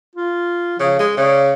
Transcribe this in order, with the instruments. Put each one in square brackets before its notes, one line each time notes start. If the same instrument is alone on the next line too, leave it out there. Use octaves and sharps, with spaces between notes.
[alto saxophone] F4
[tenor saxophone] C#3 [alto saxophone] F3
[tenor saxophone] G#3
[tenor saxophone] C#3 [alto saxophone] D5